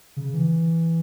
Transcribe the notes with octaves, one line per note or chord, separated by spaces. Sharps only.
C#3
E3